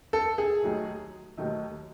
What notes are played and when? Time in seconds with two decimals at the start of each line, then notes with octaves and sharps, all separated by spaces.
0.13 A4
0.38 G#4
0.63 D#2 D#3 F#3 A3
1.37 D#2 D#3 F#3 A3